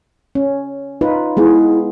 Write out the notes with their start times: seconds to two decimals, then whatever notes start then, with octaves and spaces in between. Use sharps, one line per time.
0.35 C#4
1.01 D#4 F4 B4
1.37 G#3 B3 E4 G#4